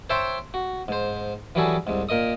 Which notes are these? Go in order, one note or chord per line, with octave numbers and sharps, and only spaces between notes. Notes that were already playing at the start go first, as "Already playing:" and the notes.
C5 C#5 E5 G5 A5 C6
F#4
G#2 C5
E3 F#3 G3 F#4 G#4 A4
C2 G#2
A#2 A#4 D#5 D#6